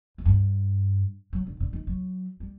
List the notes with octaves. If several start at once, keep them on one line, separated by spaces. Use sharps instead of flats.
F#2
G2
F#3
D3
D3
D#3
F#3
G3